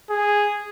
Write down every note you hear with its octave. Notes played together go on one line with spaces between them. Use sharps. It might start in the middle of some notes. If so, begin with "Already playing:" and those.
G#4